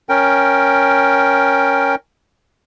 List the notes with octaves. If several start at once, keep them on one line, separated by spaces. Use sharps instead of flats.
C#4 A#4 G5